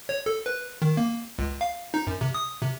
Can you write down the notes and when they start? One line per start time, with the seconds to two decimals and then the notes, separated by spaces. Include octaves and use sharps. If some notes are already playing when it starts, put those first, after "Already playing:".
0.09 C#5
0.26 A4
0.46 B4
0.82 D#3
0.97 A#3
1.39 C#2
1.61 F5
1.94 D#4
2.07 F#2
2.21 C3
2.34 D#6
2.62 C3